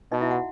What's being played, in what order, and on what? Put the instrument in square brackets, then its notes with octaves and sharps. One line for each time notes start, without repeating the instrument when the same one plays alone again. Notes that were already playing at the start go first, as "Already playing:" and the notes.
[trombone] B2 [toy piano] D#4 D#5
[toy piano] E4 E5
F#4 F#5